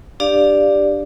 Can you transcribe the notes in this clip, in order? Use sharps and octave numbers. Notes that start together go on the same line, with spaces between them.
D4 G4 D5 F5